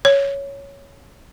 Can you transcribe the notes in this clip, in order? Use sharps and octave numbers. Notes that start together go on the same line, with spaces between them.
C#5